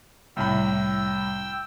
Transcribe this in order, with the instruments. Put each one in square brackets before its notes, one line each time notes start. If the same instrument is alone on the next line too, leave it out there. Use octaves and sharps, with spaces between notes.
[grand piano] C2 A2 B5 [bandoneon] G5 E6